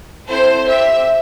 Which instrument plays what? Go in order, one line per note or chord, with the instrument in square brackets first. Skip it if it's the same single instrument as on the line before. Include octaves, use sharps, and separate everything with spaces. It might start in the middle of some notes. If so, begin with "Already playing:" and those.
[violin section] C4 E4 A4 C5
C4 G4 E5